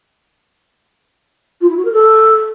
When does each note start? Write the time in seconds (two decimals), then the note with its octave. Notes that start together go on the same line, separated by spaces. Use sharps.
1.61 F4
1.69 E4
1.77 F#4
1.85 A#4
1.93 A4